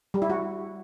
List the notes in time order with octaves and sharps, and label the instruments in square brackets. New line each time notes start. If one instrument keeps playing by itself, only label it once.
[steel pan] G3
E4
F#4